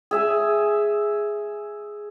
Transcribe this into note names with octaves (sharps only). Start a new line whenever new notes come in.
G#4 E5 G#5